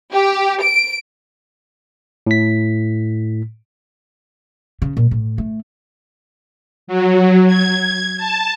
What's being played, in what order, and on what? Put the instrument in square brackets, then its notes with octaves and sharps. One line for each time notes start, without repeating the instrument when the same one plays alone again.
[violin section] G4
D7
[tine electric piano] A2 B6
[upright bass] C#3
A#2
A2
A3
[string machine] F#3
G#6
A5